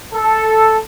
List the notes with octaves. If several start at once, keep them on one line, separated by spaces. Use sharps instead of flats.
A4